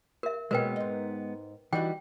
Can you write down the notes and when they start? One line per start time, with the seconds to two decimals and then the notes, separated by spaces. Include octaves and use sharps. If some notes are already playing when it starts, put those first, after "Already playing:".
0.23 A#4 E5
0.51 B2 G#3 A#3 B3 C#4 A#4 B4 G5
0.76 G#2 D#4
1.73 E3 G3 D#4 F#4 G5